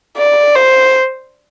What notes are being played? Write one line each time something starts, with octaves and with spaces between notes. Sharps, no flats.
D5
C5